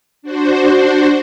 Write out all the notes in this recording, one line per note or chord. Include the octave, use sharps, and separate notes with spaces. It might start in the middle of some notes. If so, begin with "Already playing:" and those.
D4 F#4 C5